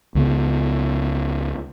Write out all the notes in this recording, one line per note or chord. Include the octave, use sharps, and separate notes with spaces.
C#2 C#3 B3